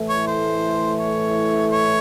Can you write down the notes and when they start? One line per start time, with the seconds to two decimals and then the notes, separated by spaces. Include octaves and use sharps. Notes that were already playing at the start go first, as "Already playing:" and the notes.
Already playing: A2 E3 A3
0.09 C#5
0.27 C5
0.99 C#5
1.72 C#5